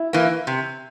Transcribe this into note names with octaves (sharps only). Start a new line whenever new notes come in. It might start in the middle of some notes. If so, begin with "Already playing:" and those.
Already playing: E4
E3 A#3
C3